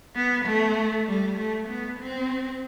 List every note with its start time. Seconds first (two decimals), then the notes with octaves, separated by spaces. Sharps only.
0.15 B3
0.45 A3
1.07 G3
1.38 A3
1.68 B3
2.00 C4